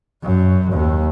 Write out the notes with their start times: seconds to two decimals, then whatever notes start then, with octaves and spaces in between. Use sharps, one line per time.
0.24 F#2
0.73 D#2